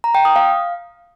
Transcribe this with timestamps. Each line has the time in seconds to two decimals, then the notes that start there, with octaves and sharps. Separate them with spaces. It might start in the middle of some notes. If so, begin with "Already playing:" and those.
0.04 A#5
0.15 G5
0.25 D#6
0.36 F5